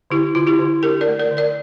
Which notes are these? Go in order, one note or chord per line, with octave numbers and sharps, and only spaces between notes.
D3 E4 G4
D3 F4
E4 G4
D3
D4 G4 A#4
A#4 D5
A3
A#4 D5
D3
A#4 D5